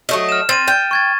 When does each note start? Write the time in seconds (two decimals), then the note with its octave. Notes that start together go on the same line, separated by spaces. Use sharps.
0.09 F#3 A3 D#5
0.29 F6 E7
0.49 C4 A6 D#7
0.68 G5
0.91 C#6 G#6 A6